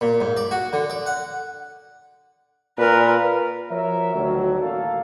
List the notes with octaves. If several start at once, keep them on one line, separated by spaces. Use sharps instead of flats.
A#2
G#2
D5
F#4
D3
D5
F#5
A#2 A#4 B4
F3 F#4 A#4 C#5 E5
D2 D#3 F#3 D4 F#4
A1 A#3 A4 A#4 F5